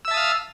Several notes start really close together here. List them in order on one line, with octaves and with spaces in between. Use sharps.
E6 E5 A5 D#6 F5